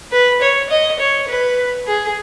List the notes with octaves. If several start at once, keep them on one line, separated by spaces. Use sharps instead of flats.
B4
C#5
D#5
C#5
B4
G#4